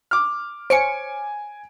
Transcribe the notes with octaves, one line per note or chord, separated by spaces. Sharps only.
D6 F6
C5 C#5 G#5 C#7 D7